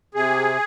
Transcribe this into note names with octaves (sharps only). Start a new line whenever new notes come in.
C3 G#4